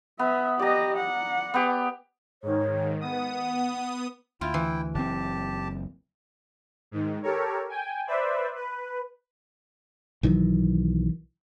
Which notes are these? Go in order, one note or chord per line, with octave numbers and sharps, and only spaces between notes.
B3 E5
G4 D5 D#5 A#5
F#5
B3 G4
G#2 D#3 C#5
B3 F#5 D#6
D2 E4 F4 G5
E3
F#1 C4 G4 A5
G#2 D#3
G4 A4 A#4 C#5
G5 G#5
B4 C5 D5 E5
B4
B1 D#3 E3 F#3